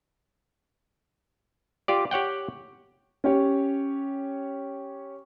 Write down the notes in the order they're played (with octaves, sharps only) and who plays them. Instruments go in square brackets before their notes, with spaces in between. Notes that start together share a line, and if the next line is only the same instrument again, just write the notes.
[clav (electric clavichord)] F4 G4 D5
G4 C#5 F#5 G5
[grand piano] C#4 G4 C#5